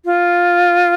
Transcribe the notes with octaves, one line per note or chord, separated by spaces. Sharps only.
F4